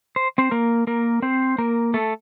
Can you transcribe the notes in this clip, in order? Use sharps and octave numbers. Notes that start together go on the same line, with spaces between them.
C5
C4 C5
A#3 A#4
A#3 A#4
C4 C5
A#3 A#4
A3 A4